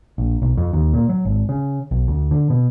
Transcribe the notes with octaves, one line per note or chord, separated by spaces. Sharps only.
A#1
B1
F2
D#2
A#2
F#3
G#1
C#3
B1
D2
D3
B2